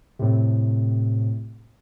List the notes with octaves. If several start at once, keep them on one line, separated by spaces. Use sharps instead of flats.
A2 C3